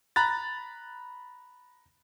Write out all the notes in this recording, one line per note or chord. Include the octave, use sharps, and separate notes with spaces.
A#5 B5 F#6 A6